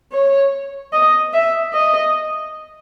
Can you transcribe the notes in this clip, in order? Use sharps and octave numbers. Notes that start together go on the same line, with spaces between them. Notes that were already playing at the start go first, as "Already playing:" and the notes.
C#5
D#5
E5
D#5